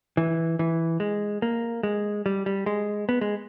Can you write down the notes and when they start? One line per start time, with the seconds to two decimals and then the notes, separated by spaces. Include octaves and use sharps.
0.17 E3
0.59 E3
1.00 G#3
1.42 A#3
1.83 G#3
2.26 G3
2.46 G3
2.66 G#3
3.09 B3
3.21 G#3